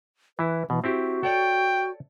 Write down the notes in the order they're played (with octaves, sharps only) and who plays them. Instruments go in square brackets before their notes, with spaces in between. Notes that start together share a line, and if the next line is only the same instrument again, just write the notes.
[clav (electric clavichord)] E3 E4 [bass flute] B4
[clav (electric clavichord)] B2 [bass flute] E3
[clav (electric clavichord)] C4 E4 G4 [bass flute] F#4
[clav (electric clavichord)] A4 C#5 D5 [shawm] G5